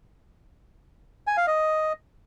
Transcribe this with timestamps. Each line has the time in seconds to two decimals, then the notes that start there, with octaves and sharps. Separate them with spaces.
1.27 G#5
1.37 F5
1.47 D#5